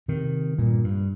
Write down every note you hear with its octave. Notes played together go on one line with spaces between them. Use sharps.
C3 D#3
G2 A#2
G2